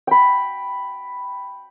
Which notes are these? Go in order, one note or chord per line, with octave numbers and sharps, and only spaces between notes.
G5 B5